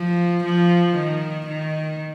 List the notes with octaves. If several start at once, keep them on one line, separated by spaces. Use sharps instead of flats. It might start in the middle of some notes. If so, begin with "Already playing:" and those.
Already playing: F3
F3
D#3
D#3